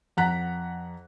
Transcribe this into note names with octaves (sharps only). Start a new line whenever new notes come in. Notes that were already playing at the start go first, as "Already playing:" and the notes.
F2 F#5 A#5 F#6 B6